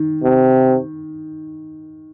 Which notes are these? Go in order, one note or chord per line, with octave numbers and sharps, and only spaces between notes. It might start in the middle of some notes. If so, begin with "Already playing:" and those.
Already playing: D#3
C3